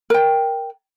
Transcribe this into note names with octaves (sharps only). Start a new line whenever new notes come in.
A#4 G5